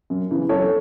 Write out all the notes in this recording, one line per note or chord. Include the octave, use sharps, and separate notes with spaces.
F#2
C#3 E3 B3
F#2 A4 C#5